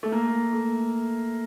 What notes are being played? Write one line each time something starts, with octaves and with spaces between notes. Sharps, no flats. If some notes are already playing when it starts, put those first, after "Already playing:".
A3
A#3
A3